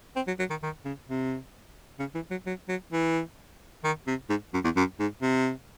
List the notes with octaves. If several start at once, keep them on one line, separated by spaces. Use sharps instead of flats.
C4
F#3
F#3
D#3
D#3
C#3
C3
C#3
E3
F#3
F#3
F#3
E3
D#3
C3
G#2
F#2
E2
F#2
G#2
C3